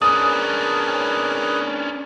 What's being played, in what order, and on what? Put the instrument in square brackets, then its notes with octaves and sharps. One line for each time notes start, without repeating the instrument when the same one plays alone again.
[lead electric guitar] C#4 D4 [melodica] G#4 A#4 B4 [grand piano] D#6